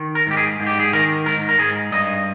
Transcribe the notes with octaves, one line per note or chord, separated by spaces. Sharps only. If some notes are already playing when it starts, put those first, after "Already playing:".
Already playing: D#3
A#4
G#2 G4
G#4
G#2
G4
G#4
D#3 A#4
G#2 A#4
A#4
G#2 G#4
G2 D#5